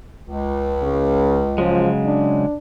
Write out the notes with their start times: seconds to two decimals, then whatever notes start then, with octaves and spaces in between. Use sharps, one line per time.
0.23 C#2
0.83 C#3
1.58 C#3 F3 F#3 G#3
2.06 D4